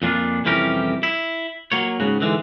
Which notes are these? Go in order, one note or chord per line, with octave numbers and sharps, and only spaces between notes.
F2 A#2 D4 F4
C2 F2 E3 C#4 G4 A#4
E4
F#3 A#3 C#5
G#2 C#3 F#4
G#2 D3 E3 G#3